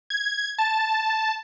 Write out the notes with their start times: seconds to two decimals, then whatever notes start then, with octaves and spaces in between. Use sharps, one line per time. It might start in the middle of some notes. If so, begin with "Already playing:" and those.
0.10 G#6
0.58 A5